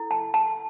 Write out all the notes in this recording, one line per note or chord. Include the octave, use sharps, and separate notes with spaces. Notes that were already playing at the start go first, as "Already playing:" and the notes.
Already playing: E4 A4
A5
A5